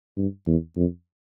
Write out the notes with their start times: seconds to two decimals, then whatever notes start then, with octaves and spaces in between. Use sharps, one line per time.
0.17 G2
0.47 E2
0.76 F2